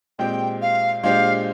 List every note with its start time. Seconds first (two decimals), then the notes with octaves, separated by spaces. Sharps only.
0.19 A#2 G#3 C4 G4 G5
0.62 F5
1.03 A#2 G#3 D4 G4 C5 F5